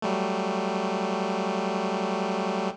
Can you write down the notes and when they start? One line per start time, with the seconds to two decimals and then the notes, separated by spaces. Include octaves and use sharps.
0.02 F#3 G3 A3